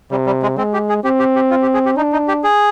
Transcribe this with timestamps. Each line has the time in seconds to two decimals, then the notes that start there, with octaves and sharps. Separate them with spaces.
0.11 C3 G3
0.26 G3
0.42 G#3
0.58 G#3 C4
0.73 G4
0.89 G#4
1.04 C4 G4
1.19 G4
1.36 G4
1.50 F4
1.62 G4
1.74 G#4
1.86 G4
1.97 D4 D#4
2.13 D#4
2.28 G4
2.44 G#4